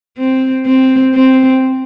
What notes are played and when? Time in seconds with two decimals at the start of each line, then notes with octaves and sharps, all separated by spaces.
0.18 C4
0.66 C4
1.14 C4